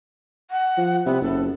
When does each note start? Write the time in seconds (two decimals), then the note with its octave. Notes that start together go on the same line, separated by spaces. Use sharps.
0.51 F#5
0.77 F3
1.06 C3 B3
1.22 F#1 A4